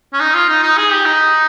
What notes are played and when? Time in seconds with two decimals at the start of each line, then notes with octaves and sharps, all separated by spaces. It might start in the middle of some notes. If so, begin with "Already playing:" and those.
0.13 C#4
0.20 D#4
0.35 F4
0.49 D#4
0.63 D#4
0.77 G#4
0.92 G4
1.06 D#4